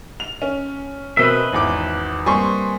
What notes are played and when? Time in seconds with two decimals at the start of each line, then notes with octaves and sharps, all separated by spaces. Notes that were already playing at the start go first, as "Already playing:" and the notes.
0.20 F7
0.42 C#4
1.17 B2 C4 A#4 B4 D#5 E5
1.53 G#1 E2 D6
2.26 G3 A#3 C4 G#5 C6 C#6